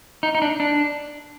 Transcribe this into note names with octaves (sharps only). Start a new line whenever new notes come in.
D#4
D#4
D4
D4